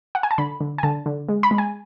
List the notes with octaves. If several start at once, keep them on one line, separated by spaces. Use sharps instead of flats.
F#5
G#5
A5
D3 B5
D3
G#5
D3 A5
D3
G#3
B5
G#3
G#5